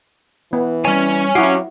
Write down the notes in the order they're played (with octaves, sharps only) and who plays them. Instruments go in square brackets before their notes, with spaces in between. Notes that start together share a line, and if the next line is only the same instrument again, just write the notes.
[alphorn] E3 [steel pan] B3
[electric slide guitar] G3 G#5 [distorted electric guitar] C#4 C#5
[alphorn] F#3 [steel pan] E4 F#4 [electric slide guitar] G4 F5 G5